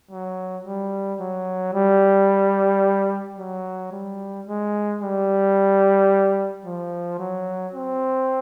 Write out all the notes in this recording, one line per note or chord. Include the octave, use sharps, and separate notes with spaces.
F#3
G3
F#3
G3
F#3
G3
G#3
G3
F3
F#3
C4